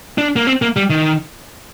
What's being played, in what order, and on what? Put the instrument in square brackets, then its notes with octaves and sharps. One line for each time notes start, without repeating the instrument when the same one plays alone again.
[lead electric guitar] D4
A#3
C4
A#3
G3
D#3